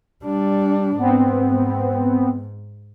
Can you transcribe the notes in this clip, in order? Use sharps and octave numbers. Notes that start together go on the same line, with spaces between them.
G3 D4
G#2 B3 C4